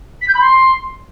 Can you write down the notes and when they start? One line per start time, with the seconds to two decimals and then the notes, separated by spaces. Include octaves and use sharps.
0.22 B6
0.28 G6
0.35 B5
0.41 C6